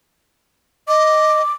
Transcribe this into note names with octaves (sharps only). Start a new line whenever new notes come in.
D#5 D6